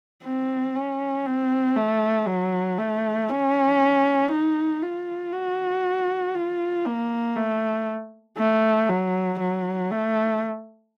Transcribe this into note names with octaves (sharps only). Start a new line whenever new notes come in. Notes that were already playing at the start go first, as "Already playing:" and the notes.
C4
C#4
C4
A3
F#3
A3
C#4
D#4
F4
F#4
F4
A#3
A3
A3
F#3
F#3
A3